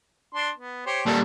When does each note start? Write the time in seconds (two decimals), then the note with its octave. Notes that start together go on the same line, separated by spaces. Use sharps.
0.35 D4 C6
0.57 B3
0.86 G4 C5 C#5
1.06 A#2 G3 A4